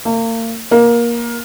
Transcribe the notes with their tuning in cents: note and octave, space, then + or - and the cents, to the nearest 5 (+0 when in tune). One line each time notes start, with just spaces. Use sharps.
A#3 -40
A#3 +15